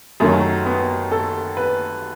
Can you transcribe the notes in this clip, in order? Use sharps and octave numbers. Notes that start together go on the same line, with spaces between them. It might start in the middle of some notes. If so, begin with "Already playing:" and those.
F#2 D#3 F#3 A3
B3
A4
B4